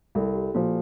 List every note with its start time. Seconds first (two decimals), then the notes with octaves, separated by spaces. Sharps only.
0.15 C2 A4
0.34 G4
0.54 A#2 F3 F#4